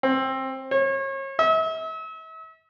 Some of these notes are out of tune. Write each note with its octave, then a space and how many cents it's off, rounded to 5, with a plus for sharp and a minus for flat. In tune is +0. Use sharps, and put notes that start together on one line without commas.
C4 +20
C#5 -35
E5 -40